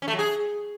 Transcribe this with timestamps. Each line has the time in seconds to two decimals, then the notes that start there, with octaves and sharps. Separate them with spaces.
0.02 C#4
0.08 A3
0.13 F#3
0.19 G#4